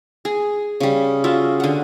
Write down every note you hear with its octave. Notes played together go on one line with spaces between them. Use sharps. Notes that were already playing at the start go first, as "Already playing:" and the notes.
G#4
C#3 G3
F4 F#4 E5
D3 F#5